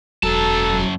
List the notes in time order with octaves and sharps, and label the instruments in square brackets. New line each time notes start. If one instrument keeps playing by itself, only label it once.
[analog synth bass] E1 [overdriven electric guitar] F#2 A5 [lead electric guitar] F#3 [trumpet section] A4